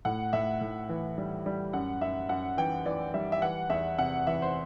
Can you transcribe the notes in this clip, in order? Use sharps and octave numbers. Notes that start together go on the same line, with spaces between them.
A2 F#5
A2 E5
A2
E3
G3
G3
F#2 F#5
F#2 E5
F#2 F#5
E3 G5
E3 D5
G3 E5
E5
E3 F#5
E2 E5
C3 F#5
E3 E5
C5